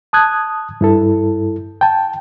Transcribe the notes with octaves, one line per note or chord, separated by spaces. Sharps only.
A5 D#6 F#6 G#6
G2 E4 A4
G5 A5